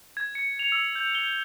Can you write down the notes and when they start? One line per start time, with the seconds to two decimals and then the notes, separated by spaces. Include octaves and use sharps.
0.17 G#6
0.35 C#7
0.59 F7
0.72 E6
0.96 G6
1.15 G7